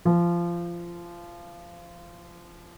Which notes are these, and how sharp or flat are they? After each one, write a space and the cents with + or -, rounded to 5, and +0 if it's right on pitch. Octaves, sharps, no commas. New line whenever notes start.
F3 -20